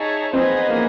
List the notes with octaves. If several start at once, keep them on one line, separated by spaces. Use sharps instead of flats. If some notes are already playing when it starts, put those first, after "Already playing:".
Already playing: D#4 G#4 C#5 E5 A5
B3 C4 D#4 G#4 B4 D#5
A#3